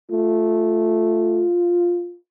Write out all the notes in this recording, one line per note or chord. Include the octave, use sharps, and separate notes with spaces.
A3 F4